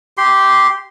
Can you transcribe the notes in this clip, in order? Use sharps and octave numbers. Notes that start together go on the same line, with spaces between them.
G4 C6